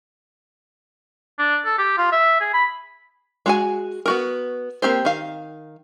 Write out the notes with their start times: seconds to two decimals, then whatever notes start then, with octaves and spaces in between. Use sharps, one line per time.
1.39 D4
1.65 A4
1.78 G4
1.97 F4
2.12 E5
2.40 G#4
2.53 B5
3.46 G#3 F#4 G#5
4.06 B3 F#4 A#4
4.82 A#3 C4 G4 C5
5.05 D#3 F5